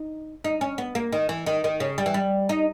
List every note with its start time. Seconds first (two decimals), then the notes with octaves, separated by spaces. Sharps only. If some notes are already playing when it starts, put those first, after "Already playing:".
Already playing: D#4
0.44 D#4
0.61 C#4
0.78 B3
0.95 A#3
1.12 D#3
1.29 E3
1.46 D#3
1.64 D#3
1.80 C#3
1.98 G3
2.06 E3
2.14 G3
2.49 D#4